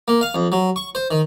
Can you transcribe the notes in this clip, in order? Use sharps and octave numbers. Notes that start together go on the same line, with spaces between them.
A#3
F5
F2
F#3
C#6
C5
D#3